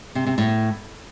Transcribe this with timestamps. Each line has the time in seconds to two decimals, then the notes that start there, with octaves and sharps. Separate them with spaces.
0.15 C3
0.27 C3
0.38 A2